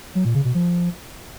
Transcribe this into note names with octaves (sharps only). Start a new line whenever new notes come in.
F#3
A#2
C#3
B2
F3